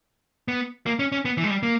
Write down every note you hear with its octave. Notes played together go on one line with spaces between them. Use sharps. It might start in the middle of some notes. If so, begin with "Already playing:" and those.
B3
A#3
C#4
C#4
B3
E3
G#3
G3
A#3